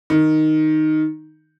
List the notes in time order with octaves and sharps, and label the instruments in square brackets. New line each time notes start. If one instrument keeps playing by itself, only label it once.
[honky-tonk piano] D#3